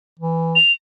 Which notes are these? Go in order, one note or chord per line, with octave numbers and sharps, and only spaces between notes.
E3
F7